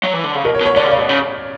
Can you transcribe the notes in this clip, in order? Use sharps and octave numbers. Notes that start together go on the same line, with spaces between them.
F#3
E3
D3
C#3
B2 A#4
C#5
B2
C#5
D3 D5
C#3
D5
B2
C#3